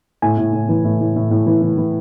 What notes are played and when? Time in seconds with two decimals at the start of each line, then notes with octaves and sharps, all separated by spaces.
0.22 A2 G#5
0.38 A2
0.53 A2
0.69 E3
0.84 A2
1.01 A2
1.16 A2
1.31 A2
1.47 E3
1.62 E3
1.78 E3